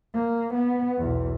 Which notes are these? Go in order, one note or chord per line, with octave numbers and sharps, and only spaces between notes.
A#3
B3
B1 E2